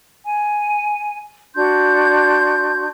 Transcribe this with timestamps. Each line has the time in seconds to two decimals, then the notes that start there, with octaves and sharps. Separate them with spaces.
0.25 G#5
1.56 D4 F#4 C6 G6